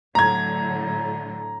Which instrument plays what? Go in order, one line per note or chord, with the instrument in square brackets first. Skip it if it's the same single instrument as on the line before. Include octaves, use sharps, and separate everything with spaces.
[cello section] A2 D3 F#3 [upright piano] A#5 G#6